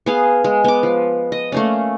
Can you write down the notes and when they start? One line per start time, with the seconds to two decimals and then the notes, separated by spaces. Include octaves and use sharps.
0.06 B3 G#4 F5
0.44 G#3
0.64 B3 D6
0.83 F3
1.32 D#5
1.52 A3 A#3 C#4